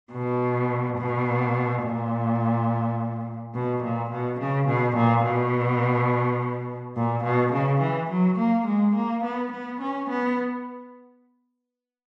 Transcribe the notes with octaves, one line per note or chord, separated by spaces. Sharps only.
B2
B2
A#2
B2
A#2
B2
C#3
B2
A#2
B2
A#2
B2
C#3
E3
F#3
A#3
G#3
A#3
B3
B3
C#4
B3